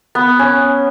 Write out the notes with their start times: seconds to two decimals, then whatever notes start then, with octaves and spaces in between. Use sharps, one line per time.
0.15 B3
0.39 C#4